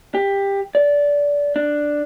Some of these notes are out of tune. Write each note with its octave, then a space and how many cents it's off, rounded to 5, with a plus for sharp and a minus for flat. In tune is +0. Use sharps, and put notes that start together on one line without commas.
G4 +15
D5 -20
D4 +5